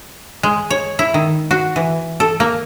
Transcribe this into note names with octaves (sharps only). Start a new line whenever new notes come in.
G#3
C#5
E4
D#3
F#4
E3
A4
A#3